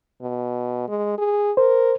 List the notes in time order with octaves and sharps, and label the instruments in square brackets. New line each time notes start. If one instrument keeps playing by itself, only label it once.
[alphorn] B2
G#3
G#4
[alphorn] A#4 [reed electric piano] C5